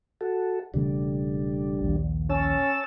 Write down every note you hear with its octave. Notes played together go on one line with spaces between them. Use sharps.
F#4 A4
E1 C#3 G3 A3 D4
A#1 D#2
C#4 C#5 A5 E6